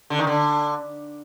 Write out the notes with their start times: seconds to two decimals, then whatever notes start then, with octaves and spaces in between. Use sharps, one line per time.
0.10 D3
0.19 D#3
0.27 D3